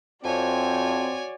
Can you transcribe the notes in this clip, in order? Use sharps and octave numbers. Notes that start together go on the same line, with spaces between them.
F2 C4 F#4 C#5 D5 G#5